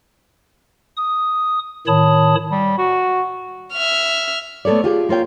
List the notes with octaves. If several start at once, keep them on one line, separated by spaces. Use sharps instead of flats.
D#6
A2 D#3 C#5 A5 B5 D#6
G3
F#4
E5 F6
A3 B3 A4 C#5 D5
F4 G4 G#4
A#3 F4 C#5 G5